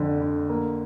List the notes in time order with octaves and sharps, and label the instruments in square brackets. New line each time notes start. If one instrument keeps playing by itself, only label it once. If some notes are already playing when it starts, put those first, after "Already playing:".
Already playing: [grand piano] F2 D3
D3
A#3